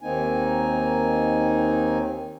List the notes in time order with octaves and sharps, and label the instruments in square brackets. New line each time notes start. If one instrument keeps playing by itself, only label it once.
[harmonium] D#2 D#3 A#3 C4 D#4 G#5